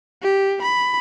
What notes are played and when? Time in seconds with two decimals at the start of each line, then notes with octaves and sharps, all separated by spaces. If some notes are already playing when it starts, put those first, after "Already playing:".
0.23 G4
0.63 B5